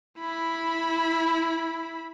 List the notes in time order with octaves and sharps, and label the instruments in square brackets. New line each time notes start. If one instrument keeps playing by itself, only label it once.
[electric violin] E4 B5